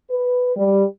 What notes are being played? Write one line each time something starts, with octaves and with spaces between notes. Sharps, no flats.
B4
G3